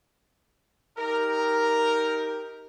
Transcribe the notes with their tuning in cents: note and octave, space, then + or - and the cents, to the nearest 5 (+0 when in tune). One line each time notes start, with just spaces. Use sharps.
D#4 +20 G4 +0 A#4 +0